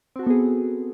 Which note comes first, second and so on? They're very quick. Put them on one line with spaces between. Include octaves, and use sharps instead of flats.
C4 F#4 A4 B3 G#4